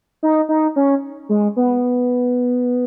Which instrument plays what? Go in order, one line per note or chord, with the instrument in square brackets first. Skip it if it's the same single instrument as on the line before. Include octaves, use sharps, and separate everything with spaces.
[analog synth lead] D#4
D#4
C#4
G#3
B3